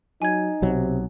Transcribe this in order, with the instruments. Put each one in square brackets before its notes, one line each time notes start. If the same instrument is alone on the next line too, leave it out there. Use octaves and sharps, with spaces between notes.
[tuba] F#3 [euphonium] D#4 [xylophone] G#5 G#6
[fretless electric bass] B1 F#3 [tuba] C3